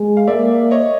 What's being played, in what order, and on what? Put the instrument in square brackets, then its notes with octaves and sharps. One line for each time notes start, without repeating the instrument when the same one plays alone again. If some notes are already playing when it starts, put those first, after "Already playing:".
Already playing: [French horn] G#3
[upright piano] F5
[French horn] A#3 [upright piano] D5 E5
[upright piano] C#5 D#5